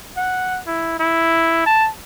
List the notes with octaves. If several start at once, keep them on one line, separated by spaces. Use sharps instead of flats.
F#5
E4
E4
A5